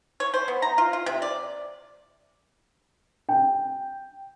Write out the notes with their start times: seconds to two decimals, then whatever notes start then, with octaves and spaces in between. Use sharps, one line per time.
0.20 C#5
0.34 C5
0.48 B3
0.62 A#5
0.78 F4
0.93 F4
1.06 C3
1.22 D5
3.29 G5